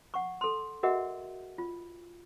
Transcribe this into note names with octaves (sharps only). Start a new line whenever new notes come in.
F#5 C#6
A4 C6
F#4 G#4 A#4 D#5 E5 F#5
F4